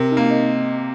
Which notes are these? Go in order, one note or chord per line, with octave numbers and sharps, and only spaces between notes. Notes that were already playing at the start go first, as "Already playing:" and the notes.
Already playing: C3 A#4
D#4
A#3
D#5